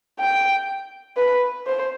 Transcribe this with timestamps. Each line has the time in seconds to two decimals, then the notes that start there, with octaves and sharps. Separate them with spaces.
0.20 G5
1.17 B4
1.67 C5